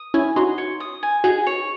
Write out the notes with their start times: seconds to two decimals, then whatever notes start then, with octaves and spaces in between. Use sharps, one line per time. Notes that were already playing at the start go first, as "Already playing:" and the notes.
Already playing: D#6
0.14 C#4 E4 G#5
0.36 D#4 F#4 C6
0.58 C#5
0.80 D#6
1.03 G#5
1.24 D#4 F#4 G#4
1.47 C#5